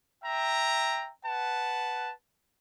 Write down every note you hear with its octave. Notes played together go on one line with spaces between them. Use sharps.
E5 G5 A#5
B4 F#5 A5